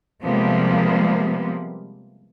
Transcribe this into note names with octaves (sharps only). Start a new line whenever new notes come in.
C3 F3 G3 G#3 A#3 B3